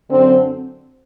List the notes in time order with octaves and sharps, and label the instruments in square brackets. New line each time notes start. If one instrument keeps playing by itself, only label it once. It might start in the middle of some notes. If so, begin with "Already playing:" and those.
[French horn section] F#2 D3 C4